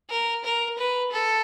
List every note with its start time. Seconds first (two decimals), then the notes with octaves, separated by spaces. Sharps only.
0.10 A#4
0.44 A#4
0.78 B4
1.12 A4